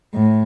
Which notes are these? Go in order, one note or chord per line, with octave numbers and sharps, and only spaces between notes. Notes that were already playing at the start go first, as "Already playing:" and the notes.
A2